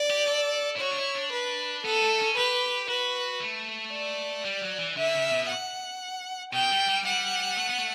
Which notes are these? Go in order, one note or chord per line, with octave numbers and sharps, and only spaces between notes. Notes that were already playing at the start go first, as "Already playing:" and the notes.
Already playing: D5
G4
A4
E4
F#4 C#5
D4
E4
D4
B4
B3 A4
A3
C#4
G4 B4
F#4 B4
A3
D5
G3
F#3
E3
D3 E5
C#3
B2
F#5
B2 G5
G3
G3
G3 F#5
A3
B3
A3